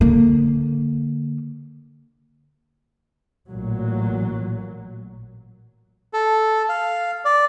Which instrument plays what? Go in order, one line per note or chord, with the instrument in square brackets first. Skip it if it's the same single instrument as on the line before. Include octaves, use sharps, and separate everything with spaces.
[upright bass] D3 A#3
[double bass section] A1 A#2 F#3
[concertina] A4
F5
D5